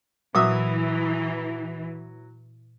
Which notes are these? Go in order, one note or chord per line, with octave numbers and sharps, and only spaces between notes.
A#2 E3 F#3 E5 D#6